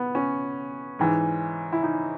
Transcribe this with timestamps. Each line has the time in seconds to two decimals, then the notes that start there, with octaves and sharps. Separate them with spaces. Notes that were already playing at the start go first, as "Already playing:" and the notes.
Already playing: B3
0.15 C#4
0.99 G#2 E3
1.73 E4
1.83 D#4